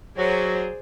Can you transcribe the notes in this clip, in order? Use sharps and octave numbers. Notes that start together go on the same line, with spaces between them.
F#3 G#4 C5 D5